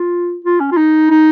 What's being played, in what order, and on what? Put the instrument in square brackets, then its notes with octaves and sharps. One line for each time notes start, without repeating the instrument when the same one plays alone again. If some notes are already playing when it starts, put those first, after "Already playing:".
Already playing: [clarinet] F4
F4
C#4
F4
D#4
D#4